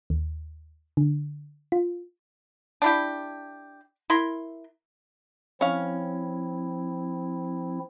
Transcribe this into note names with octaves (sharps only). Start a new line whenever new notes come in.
D#2
D3
F4
D4 E4 G4
E4 A#4 C6
F3 C4 C#4 E4 F5